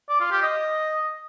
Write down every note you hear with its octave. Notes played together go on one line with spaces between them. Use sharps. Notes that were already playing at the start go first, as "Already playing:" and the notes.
D5
F4
G4
D#5